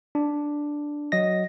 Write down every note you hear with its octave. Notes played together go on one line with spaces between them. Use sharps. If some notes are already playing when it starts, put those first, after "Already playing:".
D4
F#3 D#5 A#6